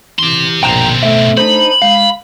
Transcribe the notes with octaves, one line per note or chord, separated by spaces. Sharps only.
E3 G4 C6
A#1 B2 C4 G5 A#5 F#6
A3 E5
D4 D#4 C5 B5
G#3 F5